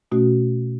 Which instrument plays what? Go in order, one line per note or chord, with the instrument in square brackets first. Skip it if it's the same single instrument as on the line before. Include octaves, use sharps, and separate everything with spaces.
[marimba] B2 A3 C#4 F#4